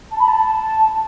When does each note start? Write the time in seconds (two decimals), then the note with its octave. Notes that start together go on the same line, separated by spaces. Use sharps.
0.11 A5
0.19 B5
0.28 A5